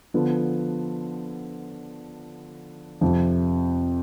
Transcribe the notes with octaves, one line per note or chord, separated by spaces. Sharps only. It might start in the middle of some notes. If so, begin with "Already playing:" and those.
D3 F3 B3 F4
F2 C3 F3